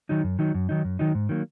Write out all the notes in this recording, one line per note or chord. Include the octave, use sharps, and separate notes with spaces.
D#3 F#3 D#4
F#2
D#3 F#3 D#4
F#2
D#3 F#3 D#4
F#2
D#3 F#3 D#4
G#2
D#3 F#3 A#3